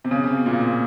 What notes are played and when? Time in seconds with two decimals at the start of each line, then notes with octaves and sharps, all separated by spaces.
0.05 C3
0.11 C#3
0.23 C3
0.34 B2
0.46 A#2